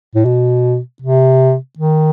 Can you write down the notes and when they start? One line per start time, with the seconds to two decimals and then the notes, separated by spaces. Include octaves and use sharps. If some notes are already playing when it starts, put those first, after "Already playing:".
0.15 A2
0.26 B2
1.02 C3
1.79 D#3